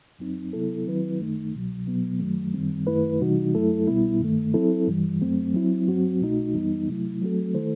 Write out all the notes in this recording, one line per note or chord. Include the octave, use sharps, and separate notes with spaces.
F#2 F#3 C4 D#4
C3 F#3 B3 E4 A4
D#3 F#3 C4 E4 B4
F#2 D#3 A3 D#4
C2 B2 F#3
B2 F#3 B3
F#2 D#3 F#3 A3
F#2 D#3 G3 C4
F#2 D#3 A3 E4 B4
C3 E3 G3 D#4 F#4
F#2 F#3 A3 E4 A4
C2 B2 G3 B3 E4
G2 D#3 A3
F#3 C4 E4 A4
G2 E3 G3
F#2 F#3 A3 C4
F#3 C4 E4
G2 F#3 C4 F#4
C2 B2 A3 D#4 F#4
F#2 E3 G3 B3 D#4
C3 F#3 A3 E4
F#3 A3 C4 F#4 A4
D#3 A3 E4 A4 C5